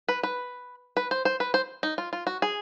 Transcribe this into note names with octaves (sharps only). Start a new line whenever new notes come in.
B4
B4
B4
C5
C5
B4
C5
D#4
F4
F4
F#4
G#4